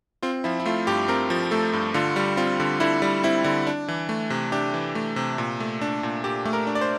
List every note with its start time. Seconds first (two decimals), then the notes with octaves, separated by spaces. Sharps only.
0.23 C4 F4
0.44 F3 E4
0.60 E4
0.66 A3 F4
0.87 G2 G4
1.08 C4 A#4
1.30 F3
1.51 A3 A4
1.73 G2
1.94 D3 F4
2.16 G3
2.37 C4 F4
2.60 D3
2.80 D3 E4
3.02 G3
3.24 C4 E4
3.44 D3
3.67 D4
3.88 E3
4.09 A3
4.30 C3
4.52 D4 G4
4.74 E3
4.95 A3
5.16 C3
5.38 A#2
5.60 A3
5.81 D4
6.03 A#2
6.24 A#2 G4
6.45 A3
6.53 A#4
6.67 D4
6.75 D5
6.81 C5